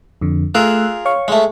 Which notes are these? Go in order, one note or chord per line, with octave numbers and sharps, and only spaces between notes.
F2 D3
A3 F4 G#4 A#4 E6 F#6
C#5 F5 C#6
G#3 A3